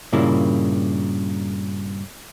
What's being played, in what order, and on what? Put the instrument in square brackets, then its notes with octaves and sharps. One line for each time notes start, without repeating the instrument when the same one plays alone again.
[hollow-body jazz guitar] G2 A#2 C#3 A#3 E4